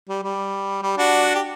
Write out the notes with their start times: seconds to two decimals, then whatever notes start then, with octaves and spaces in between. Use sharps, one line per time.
0.09 G3
0.23 G3
0.82 G3
0.97 D4 F#4
1.35 G4